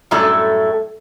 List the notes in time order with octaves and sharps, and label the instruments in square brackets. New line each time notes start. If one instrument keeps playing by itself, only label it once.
[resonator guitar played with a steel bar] F#2 A2 G3 A3 F#4 A4